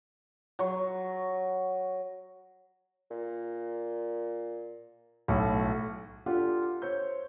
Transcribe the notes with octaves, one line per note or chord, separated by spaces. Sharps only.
F#3 C#6
A#2
B1 A2 F#4
D4 F4 G4 A4 F#5
C5 C#5 E6 G6